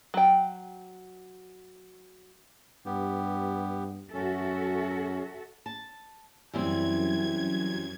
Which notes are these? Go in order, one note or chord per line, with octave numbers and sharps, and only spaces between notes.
F#3 G5
G2 B3 G4
F#2 C#4 F#4 A4 E5
A5
F#2 E3 G3 C4 G#6